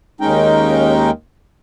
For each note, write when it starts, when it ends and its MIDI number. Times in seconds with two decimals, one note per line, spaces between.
0.21 1.10 39
0.21 1.10 56
0.21 1.10 61
0.21 1.10 63
0.21 1.10 70
0.21 1.10 79